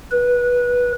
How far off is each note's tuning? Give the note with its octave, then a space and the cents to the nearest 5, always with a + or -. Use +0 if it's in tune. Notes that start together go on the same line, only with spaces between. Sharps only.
B4 -15